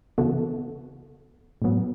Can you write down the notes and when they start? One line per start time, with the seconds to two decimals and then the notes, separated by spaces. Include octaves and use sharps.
0.18 C#3 E3 B3 F#4 A4
1.62 A2 F#3 B3